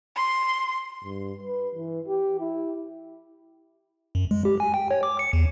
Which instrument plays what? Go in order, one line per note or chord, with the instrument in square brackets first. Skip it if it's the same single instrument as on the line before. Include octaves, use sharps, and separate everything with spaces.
[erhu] C6
[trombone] G2
B4
E3
G4
E4
[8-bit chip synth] F#2
G#3
G4
G#5
G5
C#5
D6
C#7
E2